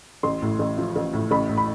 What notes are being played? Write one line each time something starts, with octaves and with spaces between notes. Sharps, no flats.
A1 C6
A2
A1
F3
A1
A2
A1 B5
A2
B5